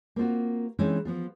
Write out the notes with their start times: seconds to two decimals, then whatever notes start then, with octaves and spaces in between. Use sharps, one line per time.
0.16 A#3 C4 F4 F#4
0.79 E3 G#3 C4 C#4 D#4
1.05 F3 B3 F4